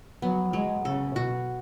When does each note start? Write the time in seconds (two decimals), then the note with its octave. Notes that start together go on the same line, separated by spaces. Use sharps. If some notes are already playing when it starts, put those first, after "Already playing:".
0.22 F#3 B3
0.53 F#3 G#3
0.85 C#3 A4
1.16 B2 F#4